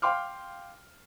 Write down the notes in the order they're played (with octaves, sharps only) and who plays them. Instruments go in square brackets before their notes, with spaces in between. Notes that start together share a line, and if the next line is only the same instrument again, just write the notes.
[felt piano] F5 G5 C6 D6 F6